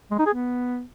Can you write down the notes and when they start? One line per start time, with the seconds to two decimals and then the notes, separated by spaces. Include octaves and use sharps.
0.11 G#3
0.19 D#4
0.26 G#4
0.33 B3